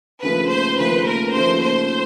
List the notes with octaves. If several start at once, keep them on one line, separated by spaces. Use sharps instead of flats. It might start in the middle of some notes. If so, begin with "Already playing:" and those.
D#2 C#3 F3 A3 B4
C5
D#2 C#3 F3 A3 B4
A#4
D#2 C#3 F3 A3 C5
C5